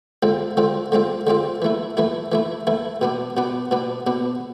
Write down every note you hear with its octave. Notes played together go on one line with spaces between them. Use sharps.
D3 G#3 C4 F4
D3 G#3 C4 F4
D3 G#3 C4 F4
D3 G#3 C4 F4
E3 A3 E4
E3 A3 E4
E3 A3 E4
E3 A3 E4
B2 B3 D4
B2 B3 D4
B2 B3 D4
B2 B3 D4